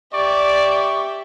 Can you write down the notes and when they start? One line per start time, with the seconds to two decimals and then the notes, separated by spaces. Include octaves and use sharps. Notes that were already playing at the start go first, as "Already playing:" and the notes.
0.13 G4 D5 E5 C#6